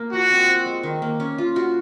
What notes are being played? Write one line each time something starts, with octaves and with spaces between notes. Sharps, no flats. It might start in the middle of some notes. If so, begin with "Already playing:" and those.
Already playing: A#3
F3 F#4
C4
C4
G#3
D#3
A#3
C#4
F4
F#4